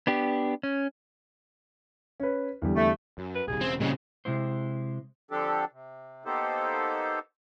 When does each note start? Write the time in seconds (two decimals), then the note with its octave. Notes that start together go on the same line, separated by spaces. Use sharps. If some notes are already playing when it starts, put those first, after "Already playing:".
0.07 B3 D4 G4
0.63 C#4
2.20 C#4 B4
2.62 E2 D3 G3
2.75 A3
3.18 F#2
3.35 B4
3.48 D#1 C2 G3 G#4
3.61 E1 C#3 C4
3.80 A#2 C#3 G3 G#3 C4
4.25 C3 G#3 E4 C5
5.31 D3 F3 C4 D4 G4 A4
5.72 C3
6.25 A#3 B3 D#4 G4 A4 C5